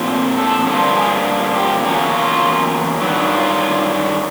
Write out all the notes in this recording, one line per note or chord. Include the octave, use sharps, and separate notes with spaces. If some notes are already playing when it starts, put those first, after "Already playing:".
Already playing: A#2 F3 A3 C4
A4
G2 D3 F3 A#3
G#4
G4
E2 C#3 F#3 A#3
F4
G2 D#3 F#3
F4